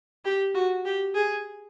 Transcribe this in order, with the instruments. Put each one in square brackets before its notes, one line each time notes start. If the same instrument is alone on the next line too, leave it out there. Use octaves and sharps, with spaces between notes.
[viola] G4
F#4
G4
G#4